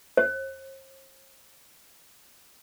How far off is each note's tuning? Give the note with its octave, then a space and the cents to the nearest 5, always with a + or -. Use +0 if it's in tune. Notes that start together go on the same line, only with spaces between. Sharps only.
C5 +45